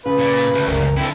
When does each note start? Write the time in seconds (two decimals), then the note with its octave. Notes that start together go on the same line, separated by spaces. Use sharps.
0.06 C#3 B4
0.18 A#2
0.54 D2 C3
0.67 C#2 F#2 A#4
0.97 D3 C4 E4